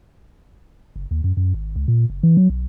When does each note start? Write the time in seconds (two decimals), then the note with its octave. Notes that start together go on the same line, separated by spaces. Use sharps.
0.96 F#1
1.11 D#2
1.24 F#2
1.37 F#2
1.54 G#1
1.76 C#2
1.88 A#2
2.10 F#1
2.23 E3
2.37 F#3
2.50 B1